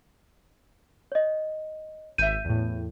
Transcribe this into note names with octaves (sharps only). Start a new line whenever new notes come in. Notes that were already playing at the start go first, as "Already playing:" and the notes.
C#5 D#5
G#1 E5 G6 D#7
E2 A2